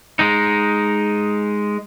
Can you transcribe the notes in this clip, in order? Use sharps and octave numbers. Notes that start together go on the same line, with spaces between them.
G#3 D#4